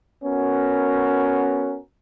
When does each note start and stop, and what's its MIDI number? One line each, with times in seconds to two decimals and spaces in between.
0.23 1.77 59
0.23 1.77 61
0.23 1.77 66
0.23 1.77 70